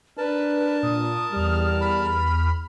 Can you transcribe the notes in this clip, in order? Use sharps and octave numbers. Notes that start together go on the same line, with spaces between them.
D4 A#4 B4 A5
A#2 D#6
E2 G3 F6
B5